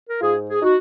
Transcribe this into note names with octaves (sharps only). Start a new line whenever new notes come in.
A#4
G#2 F4 G#4
G#4
D#4 F#4